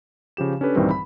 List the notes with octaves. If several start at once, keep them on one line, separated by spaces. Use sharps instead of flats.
C#3 F3 G4 E7
C#4 D4 G4 A4 B4
A#1 G2 D#3 E3 G3 C4
B5